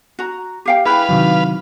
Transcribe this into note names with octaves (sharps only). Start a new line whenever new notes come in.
F#4 A#5
G4 F5 G5
E4 G#4 B4 F5 G5 B5 F#6
C3 D#3 F#3